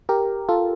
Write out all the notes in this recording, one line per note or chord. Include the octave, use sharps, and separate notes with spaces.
G4 A#4
F4 A4